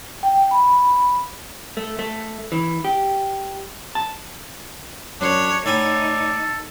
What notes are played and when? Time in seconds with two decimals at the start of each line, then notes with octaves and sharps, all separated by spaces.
0.23 G5
0.51 B5
1.77 A3
1.99 A3
2.52 E3
2.85 G4
3.95 A5
5.21 F#2 D4 C#5
5.66 A2 D#4 E4 A4 D5 G#5